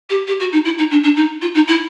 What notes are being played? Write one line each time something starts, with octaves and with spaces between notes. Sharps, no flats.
G4
G4
F#4
D#4
E4
D#4
D4
D4
D#4
F4
D#4
E4